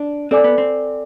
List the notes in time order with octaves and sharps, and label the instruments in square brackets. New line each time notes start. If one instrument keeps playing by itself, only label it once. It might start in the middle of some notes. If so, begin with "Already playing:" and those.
Already playing: [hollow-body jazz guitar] D4
[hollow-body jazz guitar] C4 [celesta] A4 D5 G#5 D6
[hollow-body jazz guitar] B3
C4